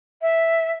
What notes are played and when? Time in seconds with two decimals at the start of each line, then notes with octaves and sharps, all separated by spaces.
0.21 E5